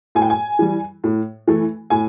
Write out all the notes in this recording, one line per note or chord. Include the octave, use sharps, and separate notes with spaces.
A2 G#5
G5
G#5
E3 G3
A2
E3 A3
A2 G#5